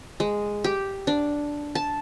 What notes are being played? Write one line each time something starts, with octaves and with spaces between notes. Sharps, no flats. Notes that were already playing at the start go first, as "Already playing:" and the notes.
G#3
G4
D4
A5